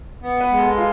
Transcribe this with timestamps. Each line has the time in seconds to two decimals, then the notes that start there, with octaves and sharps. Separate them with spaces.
0.22 B3
0.41 B4
0.51 G#3
0.59 A4
0.77 F4